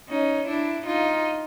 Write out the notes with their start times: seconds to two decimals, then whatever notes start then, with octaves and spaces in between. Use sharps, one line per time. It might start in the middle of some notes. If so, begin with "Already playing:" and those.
0.08 C#4 D#4
0.47 D4 E4
0.86 D#4 F4